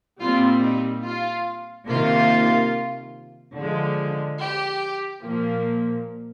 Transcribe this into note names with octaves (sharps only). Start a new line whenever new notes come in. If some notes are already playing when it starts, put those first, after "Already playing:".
A#2 G3 C4 F4
D#4
F4
C3 D#3 A#3 F4
D3 F3 G#3
G4
A#2 F3 A#3